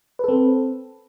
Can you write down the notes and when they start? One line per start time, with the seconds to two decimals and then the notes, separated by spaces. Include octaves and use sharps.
0.19 B4
0.24 A4
0.28 C4